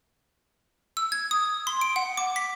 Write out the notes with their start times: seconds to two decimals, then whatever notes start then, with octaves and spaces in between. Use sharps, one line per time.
0.97 E6
1.12 G#6
1.31 D#6
1.67 C6
1.81 D7
1.96 F#5
2.17 D6
2.36 B6